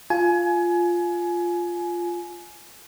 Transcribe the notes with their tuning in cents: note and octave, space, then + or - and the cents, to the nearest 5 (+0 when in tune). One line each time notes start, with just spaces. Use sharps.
F4 +0 G#5 +25